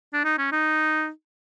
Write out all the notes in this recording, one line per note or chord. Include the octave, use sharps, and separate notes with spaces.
D4
D#4
C#4
D#4